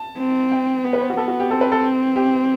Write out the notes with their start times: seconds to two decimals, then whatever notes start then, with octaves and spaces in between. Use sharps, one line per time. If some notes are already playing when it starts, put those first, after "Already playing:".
Already playing: A5
0.18 C4
0.52 G5
0.84 B3
0.93 B4
1.01 C5
1.10 F#4
1.17 B3 A4
1.28 F#4
1.40 G4
1.51 C4 A4
1.61 B4
1.72 A4
2.16 G4